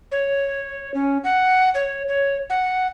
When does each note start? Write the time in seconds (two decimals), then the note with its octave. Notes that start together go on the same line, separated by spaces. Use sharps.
0.12 C#5
0.94 C#4
1.24 F#5
1.75 C#5
2.08 C#5
2.50 F#5